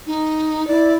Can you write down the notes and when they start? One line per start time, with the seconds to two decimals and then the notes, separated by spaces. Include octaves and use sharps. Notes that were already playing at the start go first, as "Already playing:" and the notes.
0.07 D#4
0.67 E4 D5